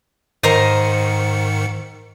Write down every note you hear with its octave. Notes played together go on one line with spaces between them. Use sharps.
G#2 D#3 A#4 C5 D#5 C#7